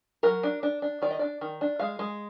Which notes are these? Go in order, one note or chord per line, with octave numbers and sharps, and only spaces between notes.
F#3 A#4
D4
D4
D4
D#3 D5
D#5
D4 D5
D#3
D4
G#3 F5
G#3